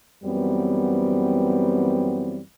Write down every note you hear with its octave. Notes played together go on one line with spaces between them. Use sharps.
F#2 E3 G3 B3 C4